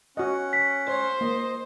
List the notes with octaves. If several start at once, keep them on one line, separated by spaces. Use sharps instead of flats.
C#4 F#4 D#5 F#5
B6
C5 C#5
A#3 D#5